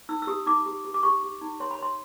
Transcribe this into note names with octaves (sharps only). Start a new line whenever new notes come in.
D#4 E6
E6
G4 D#6
D#4 D6
G4
G4
D6
G4 C#6
G4
D#4
C#5 C6
B5
C#5 C6